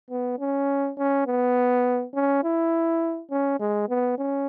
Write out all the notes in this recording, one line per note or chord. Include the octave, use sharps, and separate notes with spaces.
B3
C#4
C#4
B3
C#4
E4
C#4
G#3
B3
C#4